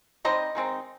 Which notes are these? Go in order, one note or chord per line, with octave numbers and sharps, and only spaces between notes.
G3 C4 D#4 C5 D#5
D#3 G#3 C4 D#4